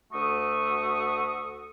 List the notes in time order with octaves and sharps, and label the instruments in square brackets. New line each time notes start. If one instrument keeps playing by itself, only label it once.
[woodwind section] D2 A3 F#4 C#6 D#6